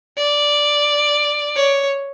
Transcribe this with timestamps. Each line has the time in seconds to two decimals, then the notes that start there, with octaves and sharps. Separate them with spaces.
0.17 D5
1.56 C#5